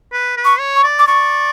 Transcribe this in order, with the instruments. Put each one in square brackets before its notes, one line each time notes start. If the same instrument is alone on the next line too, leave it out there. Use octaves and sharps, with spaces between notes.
[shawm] B4
B4
[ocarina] C#6
[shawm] C#5
[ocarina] C#6
[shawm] D5
[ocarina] D6
[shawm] D5 [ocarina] C#6